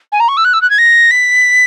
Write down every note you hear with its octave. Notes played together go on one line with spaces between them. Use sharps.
G#5
A#5
C#6
E6
F#6
E6
F#6
G#6
A#6
B6